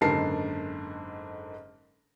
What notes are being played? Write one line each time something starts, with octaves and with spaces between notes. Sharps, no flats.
F#1 G#2 D3 A#4 A5 C7